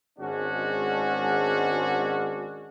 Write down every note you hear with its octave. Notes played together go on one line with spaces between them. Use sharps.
G#1 G#2 G#3 C#4 D4 F#4